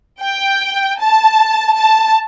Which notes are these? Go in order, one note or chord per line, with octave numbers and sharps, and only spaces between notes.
G5
A5
A5